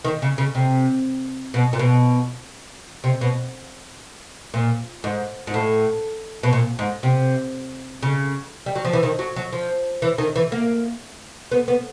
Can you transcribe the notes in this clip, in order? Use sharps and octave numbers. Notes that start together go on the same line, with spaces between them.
D#3
C#3
C#3
C3
B2
A#2
B2
C3
B2
A#2
G#2
G#2
A2
B2
A#2
G#2
C3
C#3
G3
F#3
F3
E3
D#3
F#3
F#3
F3
E3
D#3
E3
A#3
B3
B3